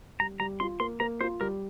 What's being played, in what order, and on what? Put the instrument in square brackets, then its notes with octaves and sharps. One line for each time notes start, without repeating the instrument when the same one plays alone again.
[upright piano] G3 [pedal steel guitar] A#5
[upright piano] G3 [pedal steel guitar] A#5
[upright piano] F4 [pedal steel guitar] C6
[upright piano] A#3 [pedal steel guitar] C6
[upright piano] A#3 [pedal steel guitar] A#5
[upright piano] F4 [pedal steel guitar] C5
[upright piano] G3 [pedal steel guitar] A#4